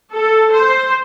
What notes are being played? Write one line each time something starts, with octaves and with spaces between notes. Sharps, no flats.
A4
C5